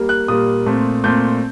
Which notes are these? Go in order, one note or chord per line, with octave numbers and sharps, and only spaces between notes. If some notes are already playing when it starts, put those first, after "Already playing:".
Already playing: G3 A#3
F#6
A#2 G3 A#3 D#6
A#2 A3 C4
A#2 A3 C4 G6